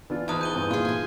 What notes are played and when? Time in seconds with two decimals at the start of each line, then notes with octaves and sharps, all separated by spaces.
0.10 E3 D4 F4
0.28 E2 G#2 A5 D#6 F#6
0.41 G6 D#7 G7
0.54 G2 E3 C4
0.70 A#2 F4 G#4
0.85 G#5 C6